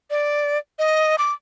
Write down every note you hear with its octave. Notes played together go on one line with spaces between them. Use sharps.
D5
D#5
D6